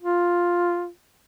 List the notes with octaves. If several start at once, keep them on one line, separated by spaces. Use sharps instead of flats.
F4